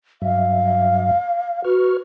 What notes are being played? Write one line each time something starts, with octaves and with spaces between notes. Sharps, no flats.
G2 F#3 E5 F5
F#4 B4 C#6 F6